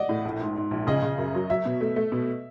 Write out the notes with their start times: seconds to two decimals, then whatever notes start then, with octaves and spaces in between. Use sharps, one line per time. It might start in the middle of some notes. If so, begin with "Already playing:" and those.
Already playing: D5 D#5 F#5
0.09 A2
0.25 A#1
0.40 G#2
0.56 G#2
0.71 A#1
0.87 C#3 D#5
1.02 C#3
1.18 F#2
1.34 F#3
1.50 F#3 E5
1.65 B2
1.81 A3
1.96 A3
2.12 B2